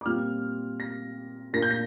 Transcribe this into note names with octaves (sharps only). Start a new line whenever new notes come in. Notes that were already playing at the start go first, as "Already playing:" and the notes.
D6
A#2 G3 C4 F4 F6
A#6
A#2 A#3 D4 F4 A#6
G6
A#6